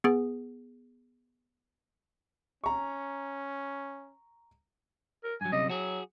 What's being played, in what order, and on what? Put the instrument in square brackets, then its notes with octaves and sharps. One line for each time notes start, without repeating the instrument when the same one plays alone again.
[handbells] B3 G#4
[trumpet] C#4 [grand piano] A#5 C#6
[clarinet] A#4
[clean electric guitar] G2 F#3 [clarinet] G#5
[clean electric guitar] F#2 C3 G3 [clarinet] D#5
[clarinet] F#3 [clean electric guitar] F#4 G#4